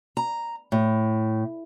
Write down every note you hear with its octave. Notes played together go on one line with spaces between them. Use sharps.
A#5
A2